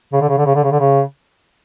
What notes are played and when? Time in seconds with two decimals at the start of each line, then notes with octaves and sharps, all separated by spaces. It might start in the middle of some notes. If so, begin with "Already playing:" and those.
0.13 C#3
0.21 D3
0.29 C#3
0.38 D3
0.46 C#3
0.55 D3
0.63 C#3
0.72 D3
0.80 C#3